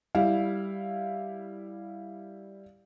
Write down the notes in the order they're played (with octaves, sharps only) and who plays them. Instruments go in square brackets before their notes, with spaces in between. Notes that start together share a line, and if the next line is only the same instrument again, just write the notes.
[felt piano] G3 E4 F5